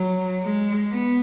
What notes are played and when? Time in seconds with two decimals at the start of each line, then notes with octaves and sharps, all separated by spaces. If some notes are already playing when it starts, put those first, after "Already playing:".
Already playing: F#3
0.42 G#3
0.91 B3